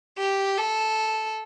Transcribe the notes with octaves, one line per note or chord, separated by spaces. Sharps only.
G4
A4